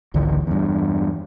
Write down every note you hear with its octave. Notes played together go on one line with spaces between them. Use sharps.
G#1 C#2 D3 E3
E2 G2